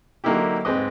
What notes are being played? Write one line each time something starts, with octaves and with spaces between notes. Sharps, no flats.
D3 F#3 A#3 D#4 E4 G4
G#2 G#3 C4 B4 D#5